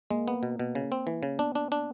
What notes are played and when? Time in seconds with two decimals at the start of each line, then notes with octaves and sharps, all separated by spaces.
0.10 G#3 A#3
0.28 B3
0.43 B2
0.59 B2
0.75 C#3
0.92 C4
1.07 E3
1.23 C#3
1.39 B3 D4
1.55 D4
1.72 D4